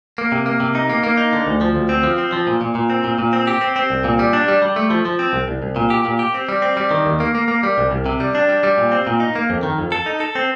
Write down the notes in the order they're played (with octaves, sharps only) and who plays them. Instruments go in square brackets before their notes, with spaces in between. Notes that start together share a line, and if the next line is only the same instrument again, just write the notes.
[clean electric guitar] A#3
C3
A#3
C3
D#4
A#3
A#3
D#4
D3
D2
F3
D2
C4
F3
C4
F3
A#2
A#2
A#2
C4
A#2
A#2
C4
G4
C4
C4
C2
A#2
G3
D4
G3
G3
A3
F3
F3
C4
C2
C2
C2
A#2
G4
A#2
G4
C4
G3
C4
G3
D#3
D#2
A#3
A#3
A#3
G3
C2
C2
C3
G3
D4
G3
G3
A#2
C4
A#2
D#4
A#3
F2
D#3
F2
A4
D#4
A4
C4